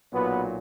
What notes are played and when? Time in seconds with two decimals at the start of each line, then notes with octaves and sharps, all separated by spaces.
0.12 B1 A#2 F#3 B3